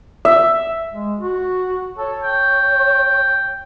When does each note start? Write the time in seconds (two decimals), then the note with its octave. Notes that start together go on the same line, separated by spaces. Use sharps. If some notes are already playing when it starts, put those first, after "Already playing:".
0.25 E5
0.92 G#3
1.19 F#4
1.97 A4 C#5
2.23 G5